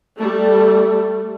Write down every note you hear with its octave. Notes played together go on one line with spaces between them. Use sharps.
G3 A3